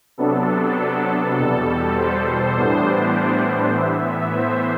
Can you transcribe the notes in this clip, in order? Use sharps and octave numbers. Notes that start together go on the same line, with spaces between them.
C3 F#3 B3 D4 A4
A4
E2 B2 G3 A4
C5
A2 E3 G3 B3 D4
A2 E3 B3 E5
C5